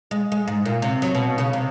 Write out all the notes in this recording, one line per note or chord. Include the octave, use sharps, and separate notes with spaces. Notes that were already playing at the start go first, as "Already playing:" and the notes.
G#3
G#3
G#2
A#2
C3
F#3
B2
C#3
C3